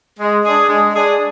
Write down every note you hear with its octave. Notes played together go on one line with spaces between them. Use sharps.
G#3
D4 G#4
G#3
D4 G#4